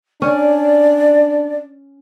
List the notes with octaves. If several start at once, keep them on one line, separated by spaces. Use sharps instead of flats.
C#4 D4 D5